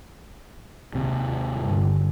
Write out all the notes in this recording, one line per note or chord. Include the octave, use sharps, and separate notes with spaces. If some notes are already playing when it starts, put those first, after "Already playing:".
D#2 C3
G2 D3